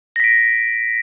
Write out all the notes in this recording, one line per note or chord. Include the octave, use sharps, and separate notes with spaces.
A#6 B6 D7